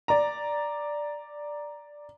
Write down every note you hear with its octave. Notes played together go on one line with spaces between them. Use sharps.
D5 A#5